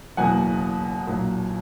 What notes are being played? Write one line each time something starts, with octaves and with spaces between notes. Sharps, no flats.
F#1 E2 B2 F#3 A#3 F#5 G#5
B1 A#2 F#3